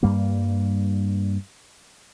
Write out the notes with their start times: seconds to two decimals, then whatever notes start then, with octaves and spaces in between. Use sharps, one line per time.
0.03 G2 G3 A#3